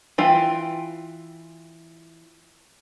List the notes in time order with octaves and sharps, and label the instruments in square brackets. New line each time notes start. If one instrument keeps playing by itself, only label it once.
[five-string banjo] E3 F4 G5